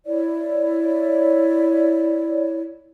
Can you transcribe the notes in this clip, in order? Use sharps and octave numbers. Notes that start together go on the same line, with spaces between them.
E4 C#5 D5